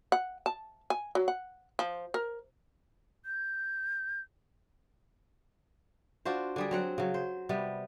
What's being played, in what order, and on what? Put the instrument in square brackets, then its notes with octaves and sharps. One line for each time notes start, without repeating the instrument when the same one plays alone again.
[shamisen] F#5
A5
G#5
F#3
F#5
F3
A#4
[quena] G6
[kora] D4 F4 F#4 C5
D3 G3 G#4
F#3 C4 F#5
C#3 F#3
C5
C3 G3 B3